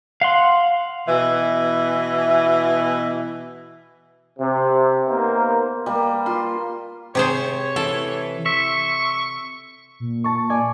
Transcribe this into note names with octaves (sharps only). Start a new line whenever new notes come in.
F5 F#5 C6
B2 E3
C3
A#3 B3 D#4 A#4 C5
G3 A#3
F4 C6
C3 G#4 C5 C#5
E3 A4
E5 C#6
A#2
A5 C#6
D5 G#5